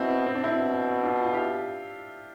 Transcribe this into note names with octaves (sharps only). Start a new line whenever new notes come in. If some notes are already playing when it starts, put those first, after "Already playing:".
Already playing: B2 C4 E4
C4
D4
B2 C4 E4
D4 F4
F4
E4 G4